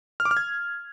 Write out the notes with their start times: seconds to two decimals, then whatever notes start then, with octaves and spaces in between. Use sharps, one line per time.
0.20 F6
0.25 D6
0.31 F6
0.37 G#6